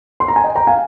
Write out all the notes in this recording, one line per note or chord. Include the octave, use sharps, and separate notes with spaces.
C6
A#5
G#5
D#5 G5
G5 A#5
F5 G#5